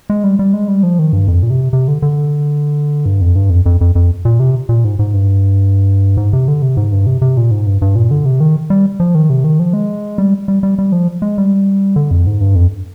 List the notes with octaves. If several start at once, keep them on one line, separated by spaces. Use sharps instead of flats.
G#3
G3
G3
G#3
G3
F3
D#3
G2
F2
A#2
C3
C3
D3
D3
G2
F2
G2
F2
F2
F2
F2
A#2
C3
A#2
G#2
G#2
G2
G#2
C3
D3
C3
G#2
G2
C3
C3
A#2
G#2
G2
G2
A#2
D3
C3
D#3
G3
F3
D#3
C3
D#3
F3
G#3
G3
G3
G3
G3
F3
G#3
G3
D3
F2
G#2
G2
F2